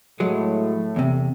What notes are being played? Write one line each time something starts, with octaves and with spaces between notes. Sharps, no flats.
A2 F#3 G#3 A3
E2 C3